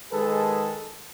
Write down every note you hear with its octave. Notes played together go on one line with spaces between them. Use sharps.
D#3 G#3 G#4 A4 B4